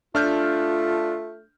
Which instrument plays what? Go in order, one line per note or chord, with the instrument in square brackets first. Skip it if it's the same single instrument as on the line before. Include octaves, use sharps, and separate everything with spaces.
[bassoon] A3 [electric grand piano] D4 F6 G6 [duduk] F4